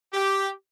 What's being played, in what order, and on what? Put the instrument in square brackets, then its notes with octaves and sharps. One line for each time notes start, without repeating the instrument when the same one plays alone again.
[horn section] G4